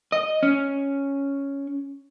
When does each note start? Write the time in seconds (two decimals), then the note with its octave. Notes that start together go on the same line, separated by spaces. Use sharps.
0.12 D#5
0.43 C#4